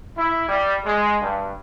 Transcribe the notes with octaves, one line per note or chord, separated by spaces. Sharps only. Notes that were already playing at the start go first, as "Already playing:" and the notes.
E4
G3
G#3
G2